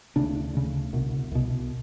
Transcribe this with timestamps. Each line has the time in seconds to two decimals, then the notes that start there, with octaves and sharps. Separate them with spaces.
0.16 D2 C#3 D4
0.54 D2 C#3
0.93 C2 B2
1.32 C2 B2